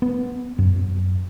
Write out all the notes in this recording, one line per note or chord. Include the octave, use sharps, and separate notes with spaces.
B3
F#2